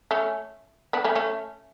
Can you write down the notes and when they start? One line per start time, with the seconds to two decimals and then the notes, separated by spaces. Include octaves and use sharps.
0.11 A3 C#4
0.93 B3 D4
1.04 A3 C#4
1.15 A3 C#4